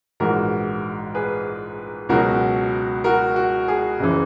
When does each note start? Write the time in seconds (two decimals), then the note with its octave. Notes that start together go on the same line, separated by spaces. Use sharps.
0.20 A#1 G#2 E3 F#4 A#4
1.15 G#4 B4
2.09 C#2 B2 F#3 F#4 A#4
3.04 F#4 A#4
3.36 F#4
3.68 G#4
3.99 F#1 C#3 E3